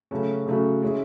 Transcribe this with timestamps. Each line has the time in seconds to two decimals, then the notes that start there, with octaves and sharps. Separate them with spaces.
0.11 C#3 F#3 A3 C#4 F#4
0.46 C#3 F#3 A3 C#4 F#4
0.82 G#3 C#4 E4